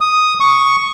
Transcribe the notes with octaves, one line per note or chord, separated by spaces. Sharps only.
D#6
C#6